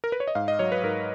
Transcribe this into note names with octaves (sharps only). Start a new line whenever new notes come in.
A#4
B4
C#5
D#5
G#2 F5
D#5
F#3 C#5
B4
G#2 A#4